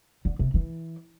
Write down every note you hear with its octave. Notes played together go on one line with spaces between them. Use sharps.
D3
C3
E3